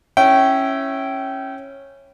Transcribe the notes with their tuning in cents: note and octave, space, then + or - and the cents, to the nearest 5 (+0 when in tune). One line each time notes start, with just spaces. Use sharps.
C#4 -15 E4 +0 G5 -25